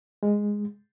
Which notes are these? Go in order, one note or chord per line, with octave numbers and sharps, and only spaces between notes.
G#3